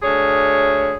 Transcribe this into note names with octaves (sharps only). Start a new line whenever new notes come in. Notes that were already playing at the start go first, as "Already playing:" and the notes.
D2 G#4 C#5